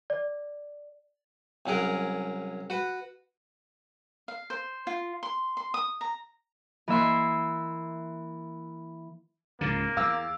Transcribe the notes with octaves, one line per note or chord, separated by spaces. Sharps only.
D5
C2 F#3 C#4 G#4 A#4
F#4 B4
F5
C5
F4
C6
C6
D#6
A#5
E3 A#3 E5 C6
C#2 G#2 C#3 A#3 A6
E2 F5 D6 E6